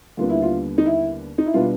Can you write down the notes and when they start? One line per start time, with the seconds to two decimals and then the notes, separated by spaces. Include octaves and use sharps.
0.17 D#2 D3 G3 B3 D4 F4
0.30 E4
0.42 F4
0.78 D#4
0.86 E4
1.38 D#4
1.46 E4
1.54 B2 G3 B3 D4 F4